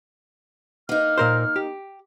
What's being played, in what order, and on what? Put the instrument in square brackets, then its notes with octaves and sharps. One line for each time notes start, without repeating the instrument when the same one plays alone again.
[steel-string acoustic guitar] A#3 D#4 [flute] F6
[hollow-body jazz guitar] A#2 A#4 C5
G4